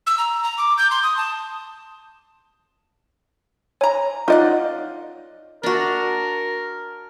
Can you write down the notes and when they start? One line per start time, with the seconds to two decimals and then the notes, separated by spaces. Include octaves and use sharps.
0.07 E6
0.18 A#5
0.44 A#5
0.58 D6
0.78 G6
0.91 C6
1.03 D#6
1.17 A5
3.81 C#5 G#5 A#5
4.28 D#4 F4 D5 D#5 F#5
5.63 D4 F#4 A#4